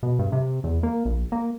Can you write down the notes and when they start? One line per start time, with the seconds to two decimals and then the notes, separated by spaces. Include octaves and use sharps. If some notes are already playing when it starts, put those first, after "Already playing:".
0.03 B2
0.19 G2
0.32 C3
0.64 E2
0.83 A#3
1.05 A#1
1.32 A#3